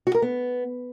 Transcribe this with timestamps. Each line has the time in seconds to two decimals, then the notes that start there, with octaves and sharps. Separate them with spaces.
0.07 F#4
0.14 A#4
0.22 B3